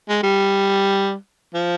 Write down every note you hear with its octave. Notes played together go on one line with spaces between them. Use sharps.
G#3
G3
F3